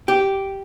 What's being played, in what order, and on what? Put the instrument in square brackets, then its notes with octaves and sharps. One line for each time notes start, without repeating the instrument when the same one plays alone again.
[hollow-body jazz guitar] G4